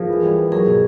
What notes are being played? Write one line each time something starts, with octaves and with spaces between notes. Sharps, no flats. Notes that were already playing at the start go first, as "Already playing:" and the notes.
Already playing: F3 G#4 A#4
E3
G3
B3
F#3 G#4 A#4
B2